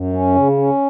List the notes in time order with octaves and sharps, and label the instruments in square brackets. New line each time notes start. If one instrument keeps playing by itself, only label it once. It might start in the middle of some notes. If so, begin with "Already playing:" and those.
Already playing: [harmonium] F#2
C#4
C#3
C#4